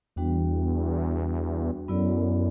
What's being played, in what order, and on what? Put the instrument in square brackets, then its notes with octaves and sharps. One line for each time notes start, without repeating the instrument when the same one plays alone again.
[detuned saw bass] E2 [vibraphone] G3 D4 F#4
[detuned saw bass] F#2 [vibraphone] F#3 B3 E4 A4 D5